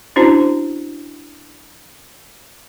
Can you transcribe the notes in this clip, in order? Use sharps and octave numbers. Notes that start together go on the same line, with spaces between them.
C#4 D4 E4 F#4 C5 A#5